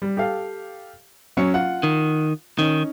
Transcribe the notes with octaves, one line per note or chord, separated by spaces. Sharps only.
G3
G4 A4 F5
F#3 C#4 C#7
F4 F#5
D#3
D#3 C#4 D#4